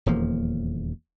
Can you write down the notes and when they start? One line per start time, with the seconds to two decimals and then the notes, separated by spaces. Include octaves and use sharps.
0.06 D#1 E2 F3 A#3